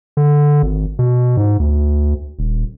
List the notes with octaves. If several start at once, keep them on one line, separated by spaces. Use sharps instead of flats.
D3
G#1
B2
G#2
D2
D#1